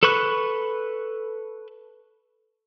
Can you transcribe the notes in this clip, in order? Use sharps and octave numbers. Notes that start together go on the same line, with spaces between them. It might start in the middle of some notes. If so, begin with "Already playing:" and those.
A4 B4 B5 C#6 F#6